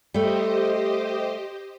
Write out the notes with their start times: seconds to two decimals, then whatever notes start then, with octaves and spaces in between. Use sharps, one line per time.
0.14 G3 A3 G4 C5 D#5